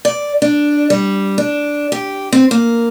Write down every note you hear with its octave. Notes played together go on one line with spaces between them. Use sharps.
D5
D4
G3
D4
G4
C4
A#3